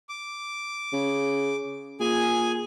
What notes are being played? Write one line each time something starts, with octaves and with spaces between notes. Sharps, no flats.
D6
C#3
A#2 G#4 G#5